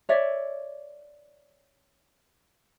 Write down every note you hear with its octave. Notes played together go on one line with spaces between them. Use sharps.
C#5 D5 E5